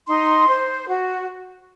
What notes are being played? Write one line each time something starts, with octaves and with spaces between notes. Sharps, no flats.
D#4 C6
C5
F#4